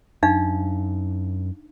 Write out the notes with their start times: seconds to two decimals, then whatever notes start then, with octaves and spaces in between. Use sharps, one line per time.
0.23 F#2 D4 D#4 F5